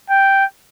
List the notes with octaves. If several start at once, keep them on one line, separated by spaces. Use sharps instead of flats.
G5